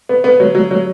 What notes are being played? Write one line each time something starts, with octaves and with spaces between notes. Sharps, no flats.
B3
B3
F#3
F#3
F#3